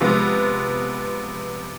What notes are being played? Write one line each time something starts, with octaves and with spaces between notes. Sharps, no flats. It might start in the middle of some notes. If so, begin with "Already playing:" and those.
C3 F3 G#3 B3